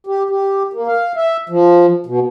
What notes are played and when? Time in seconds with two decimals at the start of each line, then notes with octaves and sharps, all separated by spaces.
0.07 G4
0.29 G4
0.73 A#3
0.88 F5
1.17 E5
1.49 F3
2.06 B2